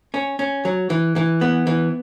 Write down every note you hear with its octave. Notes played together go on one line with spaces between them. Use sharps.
C#4
C#4
F#3
E3
E3
B3
E3